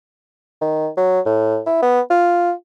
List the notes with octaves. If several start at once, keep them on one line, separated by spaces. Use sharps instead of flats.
D#3
F#3
A2
E4
B3
F4